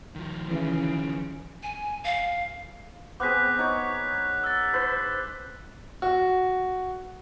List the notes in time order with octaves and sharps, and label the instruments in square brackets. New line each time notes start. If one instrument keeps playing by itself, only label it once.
[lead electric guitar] D#3 F3
[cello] C#3 [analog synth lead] E3
[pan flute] G#5
F5
[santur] B3 C4 G#4 [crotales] D6 F#6 B6
[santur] D#4 C#5
[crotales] E6 A6
[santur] B4 C5
[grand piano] F#4